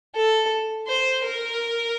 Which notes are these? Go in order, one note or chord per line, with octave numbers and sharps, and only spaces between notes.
A4
C5
A#4